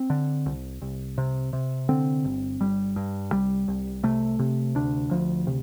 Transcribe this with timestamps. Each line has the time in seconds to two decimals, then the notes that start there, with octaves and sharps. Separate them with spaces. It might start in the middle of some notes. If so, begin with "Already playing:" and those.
Already playing: C4
0.10 D3
0.46 C2
0.82 C2
1.18 C3
1.53 C3
1.89 D3 C4
2.24 G1
2.60 G1 G3
2.96 G2
3.32 C2 G3
3.68 C2
4.03 C3 A3
4.39 C3
4.75 D2 D4
5.11 D2 F3
5.47 C3